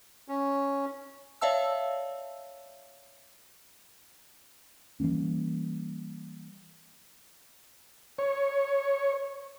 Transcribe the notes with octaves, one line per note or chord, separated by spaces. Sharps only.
C#4
C#5 D5 E5 F5 A5 E6
E3 G3 A#3 C#4
C#5